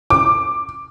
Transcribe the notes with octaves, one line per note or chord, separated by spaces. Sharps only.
D6